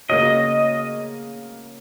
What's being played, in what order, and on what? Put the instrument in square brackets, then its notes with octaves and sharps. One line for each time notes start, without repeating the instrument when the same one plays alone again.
[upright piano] C#3 A#3 F#4 C#5 [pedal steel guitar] D#5